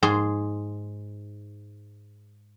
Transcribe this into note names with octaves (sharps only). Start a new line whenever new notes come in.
G#2 G#4 C6